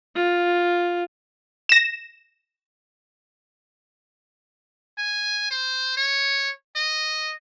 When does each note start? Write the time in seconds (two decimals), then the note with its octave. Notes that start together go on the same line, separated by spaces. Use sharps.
0.15 F4
1.69 A#6 E7
4.98 G#5
5.51 C5
5.97 C#5
6.76 D#5